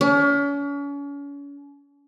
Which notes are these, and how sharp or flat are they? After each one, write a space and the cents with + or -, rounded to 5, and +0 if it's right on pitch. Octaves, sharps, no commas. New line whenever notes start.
C#4 +40